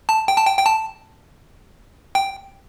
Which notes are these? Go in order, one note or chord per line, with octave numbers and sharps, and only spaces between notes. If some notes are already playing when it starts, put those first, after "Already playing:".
A5
G5
A5
G5
G5
A5
G5